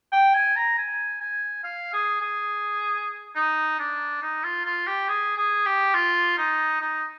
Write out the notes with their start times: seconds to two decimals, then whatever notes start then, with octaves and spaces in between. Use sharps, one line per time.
0.12 G5
0.34 G#5
0.56 A#5
0.78 G#5
1.21 G#5
1.64 F5
1.93 G#4
2.21 G#4
3.36 D#4
3.79 D4
4.22 D#4
4.44 F4
4.65 F4
4.87 G4
5.08 G#4
5.37 G#4
5.65 G4
5.94 F4
6.37 D#4
6.81 D#4